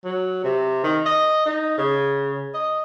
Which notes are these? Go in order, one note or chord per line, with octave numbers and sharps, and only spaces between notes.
F#3
C3
D#3
D#5
D#4
C#3
D#5